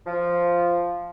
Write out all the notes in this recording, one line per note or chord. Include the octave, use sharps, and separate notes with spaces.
F3